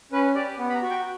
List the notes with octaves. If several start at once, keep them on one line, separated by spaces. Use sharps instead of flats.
C#4 B4
G4 D5
B3
B5
A#5
F#4
G5